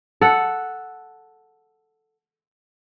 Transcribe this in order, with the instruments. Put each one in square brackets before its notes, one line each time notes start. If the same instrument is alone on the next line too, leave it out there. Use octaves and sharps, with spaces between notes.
[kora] A4 F#5